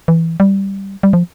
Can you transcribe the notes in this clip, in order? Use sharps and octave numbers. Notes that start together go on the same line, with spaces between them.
E3
G3
G3
F3